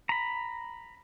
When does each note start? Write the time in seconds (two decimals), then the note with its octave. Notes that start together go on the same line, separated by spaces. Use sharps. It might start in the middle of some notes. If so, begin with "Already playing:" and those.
0.09 A#5 B5